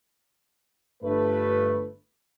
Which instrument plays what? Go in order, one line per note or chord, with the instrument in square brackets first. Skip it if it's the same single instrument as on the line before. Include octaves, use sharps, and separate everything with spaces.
[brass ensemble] G1 G2 A3 B4